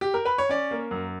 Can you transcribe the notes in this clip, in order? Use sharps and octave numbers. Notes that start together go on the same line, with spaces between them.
G4
A#4
B4
C#5
C#4 D5
A#3
F#2